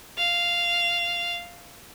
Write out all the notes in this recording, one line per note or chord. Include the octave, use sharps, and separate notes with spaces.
F5